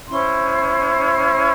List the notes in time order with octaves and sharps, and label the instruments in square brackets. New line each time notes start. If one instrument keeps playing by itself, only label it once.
[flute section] C#4 E4 C5 C6